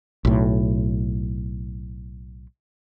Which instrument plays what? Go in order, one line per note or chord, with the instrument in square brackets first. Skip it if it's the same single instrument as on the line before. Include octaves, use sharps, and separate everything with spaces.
[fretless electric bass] B1 A2